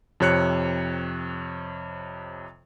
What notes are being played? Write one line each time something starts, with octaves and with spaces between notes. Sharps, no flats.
F2 C3 C#5 F#6 C#7